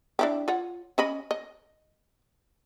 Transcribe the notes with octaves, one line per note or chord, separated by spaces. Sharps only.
D4 E4 G4
F4 C#5 F#5
C#4 D#5 B5
D#5